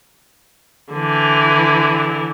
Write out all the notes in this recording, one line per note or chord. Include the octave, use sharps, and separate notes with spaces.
D3 E3